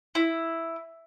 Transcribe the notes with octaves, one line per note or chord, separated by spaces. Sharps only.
E4